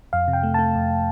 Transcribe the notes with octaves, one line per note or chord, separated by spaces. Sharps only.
F2 F5
C3
G5
A3
A3 A5
F2